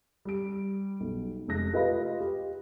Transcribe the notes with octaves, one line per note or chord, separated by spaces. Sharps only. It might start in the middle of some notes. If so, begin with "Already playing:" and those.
G3 D7
B1
F1 G#3 F#6 A#6
F4 G4 B4 D#5 F5 B5
G4